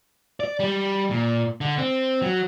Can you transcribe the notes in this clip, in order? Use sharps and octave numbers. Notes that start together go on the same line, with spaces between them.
D5
G3
A#2
D3
C4
F#3